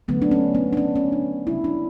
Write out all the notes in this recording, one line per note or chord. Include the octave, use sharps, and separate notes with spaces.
D3 F#3 A3 B3
D4
C#4
B3
D4
C#4
C#4
D4
C#3 G3 E4
D4